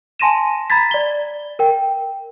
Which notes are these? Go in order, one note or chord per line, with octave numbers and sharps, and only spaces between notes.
G#5 A5 C6 A#6 D#7 E7
A#5 B5 G#6 A6 B6
D5 G7
A#4 G5